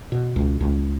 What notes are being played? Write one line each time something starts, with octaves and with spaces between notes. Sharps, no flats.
B2
C#2
C#2